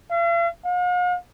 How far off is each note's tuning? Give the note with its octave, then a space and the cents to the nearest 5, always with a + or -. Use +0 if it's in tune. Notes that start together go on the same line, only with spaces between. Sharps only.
F5 -45
F5 +45